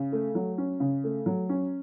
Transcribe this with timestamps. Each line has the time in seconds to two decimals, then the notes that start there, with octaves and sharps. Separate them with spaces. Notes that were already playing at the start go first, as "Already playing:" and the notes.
Already playing: C#3
0.12 A3
0.35 F#3
0.58 C#4
0.80 C#3
1.04 A3
1.26 F#3
1.49 C#4